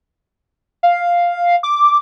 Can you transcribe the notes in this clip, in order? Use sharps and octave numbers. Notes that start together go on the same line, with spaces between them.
F5
D6